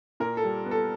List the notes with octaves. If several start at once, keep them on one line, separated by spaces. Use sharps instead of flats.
A#2 A#4
A4
G3
B3
A4